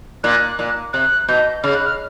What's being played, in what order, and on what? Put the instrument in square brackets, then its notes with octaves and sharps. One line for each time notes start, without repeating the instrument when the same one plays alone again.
[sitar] A#2 [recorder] F#6
[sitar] A#2
[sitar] C3 [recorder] F#6
[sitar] B2 [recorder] G6
[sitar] C#3 [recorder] F6
[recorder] F#6
F6